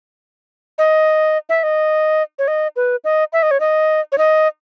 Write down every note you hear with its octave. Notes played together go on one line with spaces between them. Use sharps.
D#5
E5
D#5
C#5
D#5
B4
D#5
E5
D#5
C#5
D#5
C#5
D#5